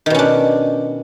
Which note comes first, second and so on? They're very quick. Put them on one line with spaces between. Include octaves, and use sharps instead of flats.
D#3 B2 C#4 D4